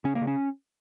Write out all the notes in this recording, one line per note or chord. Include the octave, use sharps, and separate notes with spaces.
C#3 C#4
A#3
C#3
C#4